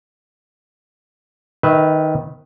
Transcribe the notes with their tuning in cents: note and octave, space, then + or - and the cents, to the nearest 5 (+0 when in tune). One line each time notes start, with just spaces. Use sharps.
D#3 +5 B4 +0 E5 -30